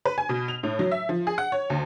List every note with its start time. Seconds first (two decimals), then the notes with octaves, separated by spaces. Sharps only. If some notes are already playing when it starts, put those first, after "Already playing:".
0.05 B4
0.18 G#5
0.29 B2
0.48 F7
0.63 A2
0.79 F#3
0.91 E5
1.09 F3
1.27 G#4
1.38 F#5
1.52 C#5
1.70 D2